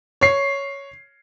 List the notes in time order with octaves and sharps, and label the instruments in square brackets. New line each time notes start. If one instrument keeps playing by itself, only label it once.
[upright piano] C#5 C7